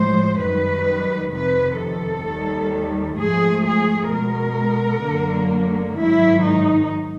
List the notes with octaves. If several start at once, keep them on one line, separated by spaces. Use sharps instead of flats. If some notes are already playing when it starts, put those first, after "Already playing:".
Already playing: A2 F3 G#3 C5
F#2 D#3 G3 B4
F2 C3 D#3 B4
A4
D#2 D#3 G3
G#2 F3 A3 G#4
G#4
B2 G#3 A#4
F#2 D3 F#3 A#3
G#2 D#3 F#3 E4
D#4